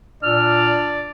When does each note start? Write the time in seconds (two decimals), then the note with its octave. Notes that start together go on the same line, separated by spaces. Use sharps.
0.23 A#2 D4 D5 F6